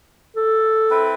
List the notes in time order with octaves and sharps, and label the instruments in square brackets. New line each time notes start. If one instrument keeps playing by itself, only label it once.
[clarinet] A4
[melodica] C4 E4 B4